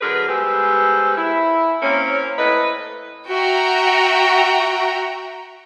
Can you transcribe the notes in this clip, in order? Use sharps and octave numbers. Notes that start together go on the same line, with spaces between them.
D3 F#3 G#4 A#4 B4
G3 G#3 B3 A4 B4 C5
E4
A#3 C4 C#4
A2 B4 D#5
F#4 E5 F#5 G5 A#5